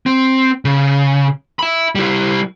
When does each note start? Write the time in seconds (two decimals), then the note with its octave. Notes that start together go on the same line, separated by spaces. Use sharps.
0.06 C4
0.65 C#3
1.59 E5 B5
1.95 G3 E4